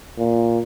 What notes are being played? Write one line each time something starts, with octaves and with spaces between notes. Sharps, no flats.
A#2